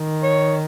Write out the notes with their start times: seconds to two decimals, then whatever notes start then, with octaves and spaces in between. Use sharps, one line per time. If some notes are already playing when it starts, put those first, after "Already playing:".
Already playing: D#3
0.23 C#5